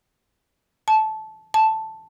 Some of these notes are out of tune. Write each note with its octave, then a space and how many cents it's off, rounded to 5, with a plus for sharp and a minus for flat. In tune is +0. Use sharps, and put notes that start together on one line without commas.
A5 -15
A5 +0